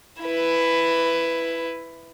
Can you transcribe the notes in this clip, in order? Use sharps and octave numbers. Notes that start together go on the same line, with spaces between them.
E4 B4